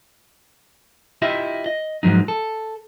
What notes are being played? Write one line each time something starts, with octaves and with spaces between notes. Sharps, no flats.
E4 F4 G4 D#5 E5
D#5
G#2 B2 F3 F#3 D#4
A4